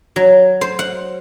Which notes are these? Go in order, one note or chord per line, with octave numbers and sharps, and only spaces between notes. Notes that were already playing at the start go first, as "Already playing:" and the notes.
F#3
C5
F#5